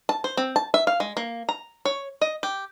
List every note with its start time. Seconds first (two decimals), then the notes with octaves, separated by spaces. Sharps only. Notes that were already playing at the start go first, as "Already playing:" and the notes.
0.09 A5
0.24 C5
0.37 C4
0.56 A5
0.74 E5
0.87 F5
1.00 G#3
1.17 A#3
1.49 A#5
1.85 C#5
2.21 D#5
2.43 G4